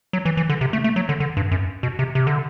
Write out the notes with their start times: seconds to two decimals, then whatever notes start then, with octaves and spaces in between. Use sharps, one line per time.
0.13 F#3
0.25 E3
0.37 E3
0.50 D3
0.61 C3
0.73 A3
0.84 A3
0.96 F#3
1.09 D3
1.20 D3
1.37 G2
1.51 F#2
1.83 B2
1.99 C3
2.15 C3
2.27 D3